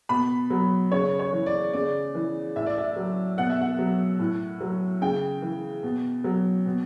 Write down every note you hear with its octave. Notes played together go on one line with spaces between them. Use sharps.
B2 B5
F#3
C#3 C#5
C#5
E3
D5
C#3 D5
E3
A2 E5
D5
E5
F#3
B2 F#5
E5
F#5
F#3
A2
F#3
C#3 G5
E3
B2
F#3
B2